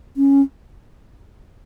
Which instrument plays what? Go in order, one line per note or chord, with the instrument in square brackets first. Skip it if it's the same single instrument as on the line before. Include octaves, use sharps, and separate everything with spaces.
[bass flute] C#4